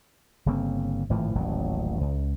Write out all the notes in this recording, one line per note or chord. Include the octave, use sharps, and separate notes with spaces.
G1 C#3 A#3 C4
G#1 A2 E3 F3
D#1 A1 A2 F#3
C#2